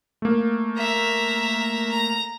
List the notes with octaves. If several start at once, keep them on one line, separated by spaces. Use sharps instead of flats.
A3 A#3
E5 A#5
A#5